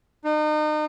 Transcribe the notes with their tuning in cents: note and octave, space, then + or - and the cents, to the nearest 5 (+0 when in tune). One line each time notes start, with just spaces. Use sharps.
D#4 -35